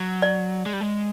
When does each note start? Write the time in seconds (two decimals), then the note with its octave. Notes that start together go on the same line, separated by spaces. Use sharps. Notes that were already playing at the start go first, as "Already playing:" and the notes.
Already playing: F#3
0.22 D5
0.66 G#3
0.73 G3
0.81 G#3